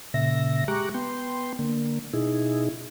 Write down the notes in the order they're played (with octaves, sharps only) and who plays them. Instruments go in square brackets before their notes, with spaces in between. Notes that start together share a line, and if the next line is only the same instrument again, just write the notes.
[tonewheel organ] A#2 C#3 E5 A#6
G#3 G4 A#5 C#6 D6 F#6
B3 G5 C6
D3 A#3
B2 D#4 E4 G#4